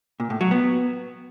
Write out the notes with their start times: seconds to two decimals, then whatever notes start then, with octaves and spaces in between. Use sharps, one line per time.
0.20 A#2
0.30 A2
0.41 F#3
0.51 B3